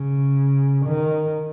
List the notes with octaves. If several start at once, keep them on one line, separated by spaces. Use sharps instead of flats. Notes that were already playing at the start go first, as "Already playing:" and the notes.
Already playing: C#3
D#3